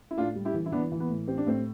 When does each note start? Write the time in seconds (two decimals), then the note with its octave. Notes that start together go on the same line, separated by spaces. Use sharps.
0.11 E4
0.17 A2 D4 F4
0.35 G3
0.45 E4 G4
0.54 E3
0.66 E4
0.72 E3 B3 D4
0.92 E3
1.00 B3
1.09 A2
1.28 C4 G4
1.37 D4
1.47 A2 C4